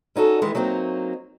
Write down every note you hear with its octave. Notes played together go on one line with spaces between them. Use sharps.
C#4 D#4 F#4 A4
D#3 E3 G#3
F#3 A#3 C4 D#4